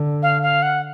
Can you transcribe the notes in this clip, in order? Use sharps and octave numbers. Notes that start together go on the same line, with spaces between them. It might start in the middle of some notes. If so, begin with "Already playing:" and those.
Already playing: D3
F5
F5
F#5